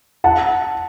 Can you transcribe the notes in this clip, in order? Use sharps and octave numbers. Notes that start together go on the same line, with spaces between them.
F#5 A5